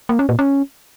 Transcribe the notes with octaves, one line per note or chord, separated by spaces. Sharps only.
A#3
C#4
A#2
C#4